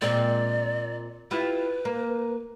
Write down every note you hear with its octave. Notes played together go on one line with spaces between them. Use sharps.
A#2 G#3 C4 D5
E4 F4 G4 B4
A#3